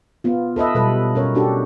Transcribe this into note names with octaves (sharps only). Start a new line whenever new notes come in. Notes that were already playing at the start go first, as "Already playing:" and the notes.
B3 F4
A4 B4 D#5 E5
B2 F#3 G3 A4 B4
C#4 A#4 C#5
D4 F#4 G4 A4